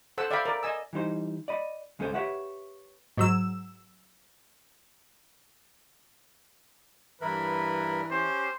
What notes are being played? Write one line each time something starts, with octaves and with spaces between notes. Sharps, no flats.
A4 C5 F#5 A5 E6
D5 E5 F5 G5 B5
A#4 D5
D#5 G#5 E6
E3 G3 D#4 C5
D5 D#5 B5
C#2 G#3 C#4 A4 C5 G#5
G4 B4 C#5 E5 F#5
G#2 F#3 E6
G2 E3 A#4 B4 B5
C#4 G4 C5